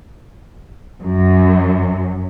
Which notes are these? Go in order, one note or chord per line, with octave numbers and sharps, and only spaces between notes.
F#2